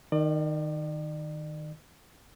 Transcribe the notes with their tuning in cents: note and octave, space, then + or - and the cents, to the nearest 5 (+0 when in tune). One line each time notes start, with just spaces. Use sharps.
D#3 -5 D5 +40